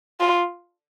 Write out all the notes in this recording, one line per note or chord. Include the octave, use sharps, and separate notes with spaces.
F4